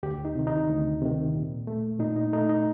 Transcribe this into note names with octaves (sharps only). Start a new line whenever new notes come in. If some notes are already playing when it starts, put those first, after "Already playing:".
D2 G4
D#4
C3 D#3
D#4
D2
C3 D#3
A#2
A3
A#2 D#4
D#4
A3 D#4
D#4